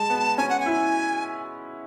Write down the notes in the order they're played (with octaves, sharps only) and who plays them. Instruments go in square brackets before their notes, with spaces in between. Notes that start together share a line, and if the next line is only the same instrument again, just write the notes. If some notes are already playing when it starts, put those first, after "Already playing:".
Already playing: [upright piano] G#3 [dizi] A5
[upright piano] B3
[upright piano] C#4 [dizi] G#5
[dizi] F#5
G#5
[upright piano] E4